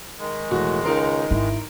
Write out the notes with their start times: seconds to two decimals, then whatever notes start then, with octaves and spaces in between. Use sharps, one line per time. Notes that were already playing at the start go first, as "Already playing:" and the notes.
0.19 D#3 G#3
0.51 E1 A2 F#4
0.84 C#2 D#4 A#4 C6
1.31 G#1 E4